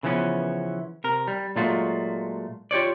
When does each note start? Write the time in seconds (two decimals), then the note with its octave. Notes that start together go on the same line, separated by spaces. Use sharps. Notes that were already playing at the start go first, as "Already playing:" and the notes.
0.03 C#3 E3 F3 B3 C#4
1.04 C3 A#4
1.28 G3
1.56 A#2 F#3 G#3 A3 F4 F#4
2.71 F4 G4 C#5 D5